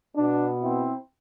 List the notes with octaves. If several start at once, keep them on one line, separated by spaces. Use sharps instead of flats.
B2 B3 D4
C4 E4